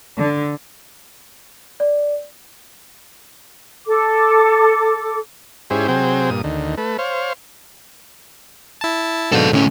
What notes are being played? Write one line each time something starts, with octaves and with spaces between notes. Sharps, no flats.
D3
D5
A4 D6
G#2 C#4 E4 G4 G#4 C5
C3 F#3 C4 G#4 G5
G2 A#2 D#6
D2 D#3
A3 B4
C5 C#5 F5
E4 A5
G#2 B2 D3 A4 F5
D2 A2 C#4